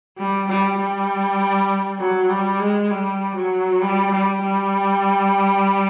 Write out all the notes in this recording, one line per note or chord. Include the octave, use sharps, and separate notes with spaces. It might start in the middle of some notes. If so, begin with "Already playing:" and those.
G3
G3
G3
F#3
G3
G#3
G3
F#3
G3
G3
G3